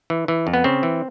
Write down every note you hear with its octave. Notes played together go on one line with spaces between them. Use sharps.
E3
E3
F2
B3
C#3 C4
E3